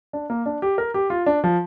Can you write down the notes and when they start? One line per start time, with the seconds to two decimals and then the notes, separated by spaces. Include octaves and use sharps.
0.13 D4
0.30 A#3
0.46 D4
0.62 G4
0.78 A#4
0.94 G4
1.10 F4
1.26 D4
1.44 F3